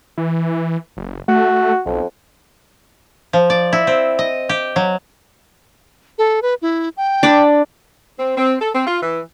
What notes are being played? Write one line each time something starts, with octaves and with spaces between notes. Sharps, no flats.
E3
F#1
A3 F#4
B1 F2
F3
D5
E4
C4
D#5
G4
F#3
A4
B4
E4
G5
D4 D5 B5
C4
C4
A4
C4
F4
E3